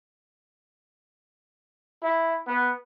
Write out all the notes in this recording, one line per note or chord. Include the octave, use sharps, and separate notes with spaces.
E4
B3